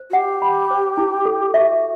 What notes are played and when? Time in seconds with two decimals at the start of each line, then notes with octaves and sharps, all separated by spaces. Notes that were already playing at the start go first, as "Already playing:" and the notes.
Already playing: C5
0.10 F#4
0.13 G4 F#5
0.42 B5
0.71 C5
0.97 E4
1.25 A4
1.54 F#4 E5